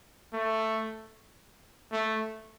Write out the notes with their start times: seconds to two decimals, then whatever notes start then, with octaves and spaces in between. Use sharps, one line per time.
0.33 A3
1.92 A3